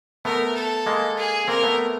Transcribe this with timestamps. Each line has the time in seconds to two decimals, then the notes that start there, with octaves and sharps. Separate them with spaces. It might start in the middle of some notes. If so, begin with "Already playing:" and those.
0.25 A3 B3 A#4
0.55 A4
0.86 G#3 A#3
1.17 G#4
1.48 A#3 C4 A#4
1.63 A3 B3